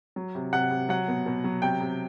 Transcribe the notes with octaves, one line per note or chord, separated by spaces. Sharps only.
F#3
C3
C3 F#5
C3
F#3 F#5
B2
B2
F#3
C3 G5
C3